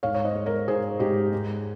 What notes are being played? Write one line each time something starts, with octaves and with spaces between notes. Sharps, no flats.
G#2 C#5 F5
C#5
C5 D#5
G#3
A#4 C#5
G#2 G#4 C5
G#2 D#4 G4
G#3